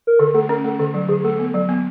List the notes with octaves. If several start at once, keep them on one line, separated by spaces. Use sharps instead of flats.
A#4
D3 A4
A3 A4
C#4 A#4
A3 A4
D3 A4
F#3
D3 G#4
A3 A4
B3
F#3
B3